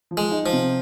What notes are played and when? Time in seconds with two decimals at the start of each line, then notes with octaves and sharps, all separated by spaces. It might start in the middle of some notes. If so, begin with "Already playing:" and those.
0.11 F3
0.17 G#3
0.31 D#4
0.46 F3
0.53 C3